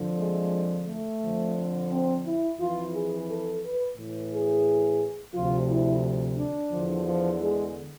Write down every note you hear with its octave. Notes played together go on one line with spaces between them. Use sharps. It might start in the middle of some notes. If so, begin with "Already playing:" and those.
Already playing: F2 D3 F3
G#3
A3
F2 D3 F3
C4
E4
F2 E3 F4
G#4
A4
B4
A2 E3
G#4
D2 C3 F3 F4
E4
D4
E2 D3 F3
F3
G#3